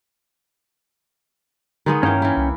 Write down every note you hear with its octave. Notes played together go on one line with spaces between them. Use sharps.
D3 D#3 G#3 B3
G2 E3 A#3 C#4 C#5 G5
E3 E4
C2